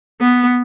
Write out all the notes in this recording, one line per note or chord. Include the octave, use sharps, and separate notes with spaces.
B3